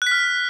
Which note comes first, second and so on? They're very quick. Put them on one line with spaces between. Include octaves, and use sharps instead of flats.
F#6 B6 F6